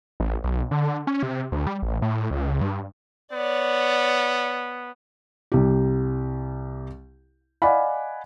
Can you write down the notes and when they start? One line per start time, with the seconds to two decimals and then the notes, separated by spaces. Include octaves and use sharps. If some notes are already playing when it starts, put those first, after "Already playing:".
0.20 A1
0.44 B1
0.71 D3
1.07 C#4
1.23 C3
1.52 D2
1.67 G3
1.82 A1
2.02 A2
2.31 C#2
2.61 G2
3.32 B3 C#5 D5
5.52 C2 G4
7.62 D5 D#5 F5 F#5 G#5 B5